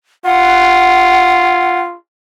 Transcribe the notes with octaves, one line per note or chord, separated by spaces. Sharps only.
F4 F#5